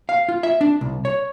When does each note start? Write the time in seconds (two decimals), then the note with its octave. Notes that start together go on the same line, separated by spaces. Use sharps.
0.09 F5
0.29 F4
0.43 E5
0.61 D4
0.81 C2
1.05 C#5